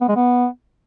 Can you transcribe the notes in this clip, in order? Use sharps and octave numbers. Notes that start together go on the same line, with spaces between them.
B3
G#3
B3